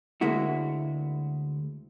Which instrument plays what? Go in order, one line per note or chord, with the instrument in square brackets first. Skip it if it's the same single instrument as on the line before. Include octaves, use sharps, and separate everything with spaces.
[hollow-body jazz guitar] D2 G#3 A#3 E4 F#4